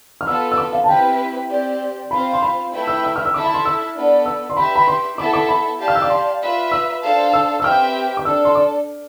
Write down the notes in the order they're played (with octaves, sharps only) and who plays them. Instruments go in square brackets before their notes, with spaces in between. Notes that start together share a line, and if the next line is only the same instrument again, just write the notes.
[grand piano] F6
[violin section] B3 F4 A4 [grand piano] E6
[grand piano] E6
D6
F5
A5
[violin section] C4 E4 G4 B4 [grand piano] G5
[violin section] C4 G4 D5
[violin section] C4 F4 C5 F5 [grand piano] B5
[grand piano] C6
B5
[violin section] A3 E4 B4 E5 G5
[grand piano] E6
E6
F6
E6
[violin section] E4 A4 E5 A5 [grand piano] D6
[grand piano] B5
C6
E6
[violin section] B3 D4 A4 D5
[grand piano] E6
C6
[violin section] G4 B4 E5 [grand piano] B5
[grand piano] B5
C6
[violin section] B3 E4 A4 E5 A5 [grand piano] D6
[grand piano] D6
B5
[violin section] G4 D5 F5 A5
[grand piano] F6
E6
D6
C6
[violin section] F4 B4 E5
[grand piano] E6
[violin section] D4 A4 C5 F5 A5
[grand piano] E6
E6
[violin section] C4 G4 B4 E5 G5 [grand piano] F6
[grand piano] D6
[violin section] D4 A4 D5 [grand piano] E6
[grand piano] C6
D6